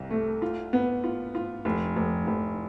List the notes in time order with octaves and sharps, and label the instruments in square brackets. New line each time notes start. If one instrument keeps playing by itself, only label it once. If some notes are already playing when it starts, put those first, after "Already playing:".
Already playing: [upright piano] C2 C3
A3
F4
B3
F4
F4
F1
F1
F1